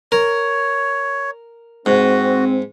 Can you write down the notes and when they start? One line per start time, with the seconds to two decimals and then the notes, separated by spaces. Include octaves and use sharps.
0.12 A#4 C#5
1.86 G#2 C4 F#4